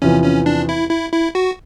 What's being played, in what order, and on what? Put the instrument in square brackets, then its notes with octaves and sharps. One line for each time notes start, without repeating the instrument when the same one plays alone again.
[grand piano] E2 C3 F3 [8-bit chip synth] C#4
[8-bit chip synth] C#4
D4
E4
E4
E4
F#4